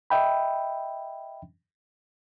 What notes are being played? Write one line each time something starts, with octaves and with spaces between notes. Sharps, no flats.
D#5 E5 G5 B5